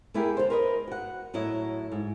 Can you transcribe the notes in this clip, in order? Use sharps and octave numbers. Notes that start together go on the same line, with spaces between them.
A3 B3 E4 G4 G#4 A#4
D3 C5
A#4 B4 D#5
F#4 F#5
A2 F#3 E4 D#5
G#2